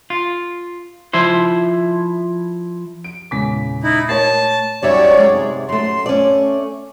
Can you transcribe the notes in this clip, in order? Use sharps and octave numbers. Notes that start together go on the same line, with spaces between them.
F4
F3 E4 C5
D7
E2 A#2 C#3 G#3 B6
D#4 E4
A3 A#4 C#5 A5 A6
F#2 G3 D#4 C#5 D5 E5
G#3
G#2 C3
F#2 A3 C6
A3 C#4 D5